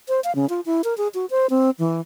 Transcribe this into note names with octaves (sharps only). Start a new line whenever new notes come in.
C5
F5
C#3
F4
E4
A#4
G#4
F#4
C5
C4
E3